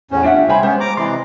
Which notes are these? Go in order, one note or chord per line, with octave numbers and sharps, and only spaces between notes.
E2 A2 C#4 C5
D4 F4 G4 E5 F#5
C2 C5 C#5 E5 G5 G#5 B5
G#3 B3 C#4 C5
A#5 D6
C3 E3 D5 D#5 C6